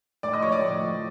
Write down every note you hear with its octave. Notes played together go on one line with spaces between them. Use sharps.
A2 D5 D6
D#5 D#6
F3 C#5 C#6
D5 D6
A2
F3